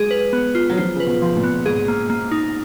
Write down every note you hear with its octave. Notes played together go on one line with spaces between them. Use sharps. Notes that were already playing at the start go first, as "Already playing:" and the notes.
Already playing: F#3 G#3 G#4
B4
B3
F4
F#3
F3 F4
C#3 B4
B2
F3
A#2
B3
G#2 G#4
A#3
A#3
D#4